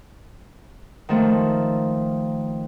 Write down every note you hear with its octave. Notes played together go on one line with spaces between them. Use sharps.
D#3 F3 A3